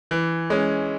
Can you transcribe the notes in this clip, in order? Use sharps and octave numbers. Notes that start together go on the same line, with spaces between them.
E3
G#3 C#4